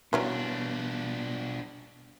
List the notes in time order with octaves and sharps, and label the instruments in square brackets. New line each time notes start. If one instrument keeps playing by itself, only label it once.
[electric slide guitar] B2 G3 B3 [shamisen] E3 F#3 C#4 [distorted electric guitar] D4 F4